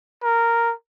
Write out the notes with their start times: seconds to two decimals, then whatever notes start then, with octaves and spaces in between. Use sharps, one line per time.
0.23 A#4